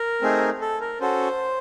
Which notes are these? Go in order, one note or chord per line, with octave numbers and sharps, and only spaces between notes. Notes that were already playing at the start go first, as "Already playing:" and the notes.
Already playing: A#4
A3 C4 D#4 G#4
A4
A#4
C#4 F#4 A4 C5